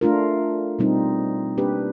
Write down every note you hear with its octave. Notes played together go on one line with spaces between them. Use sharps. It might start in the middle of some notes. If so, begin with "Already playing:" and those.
A3 D4 F4 A#4
B2 G3 C4 D#4
A#3 D4 G4 B4